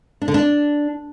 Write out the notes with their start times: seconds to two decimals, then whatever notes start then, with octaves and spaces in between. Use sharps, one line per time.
0.22 D4
0.28 D3
0.34 D4